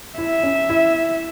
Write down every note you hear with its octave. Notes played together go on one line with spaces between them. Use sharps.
E4 E5
C#4
E4